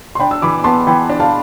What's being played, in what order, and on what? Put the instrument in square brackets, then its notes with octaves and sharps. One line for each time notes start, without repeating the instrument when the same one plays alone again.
[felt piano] C6
[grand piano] D4 [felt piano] G5 B5
[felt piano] E6
[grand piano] E3 [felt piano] B5 D6
[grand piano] B3 [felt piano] A5 C6
[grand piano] E3 [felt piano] G5 B5
[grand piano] D4
[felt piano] F5 A5